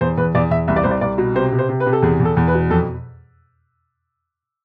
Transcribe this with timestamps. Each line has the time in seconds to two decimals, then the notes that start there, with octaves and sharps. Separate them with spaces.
0.01 E2 C5
0.17 E2 B4
0.35 E2 D5
0.50 E2 E5
0.68 C2 E5
0.76 D5
0.83 C2 C5
0.91 D5
1.01 C2 D5
1.18 B2
1.35 C3 C5
1.52 C3
1.59 C5
1.69 C3
1.80 B4
1.86 C3
1.93 A4
2.02 E2 G#4
2.20 E2
2.25 A4
2.37 E2
2.47 B4
2.54 B2
2.70 F2 A4